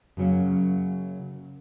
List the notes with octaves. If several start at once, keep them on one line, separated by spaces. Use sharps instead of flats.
F#2 C#3 F#3 A#3 C#4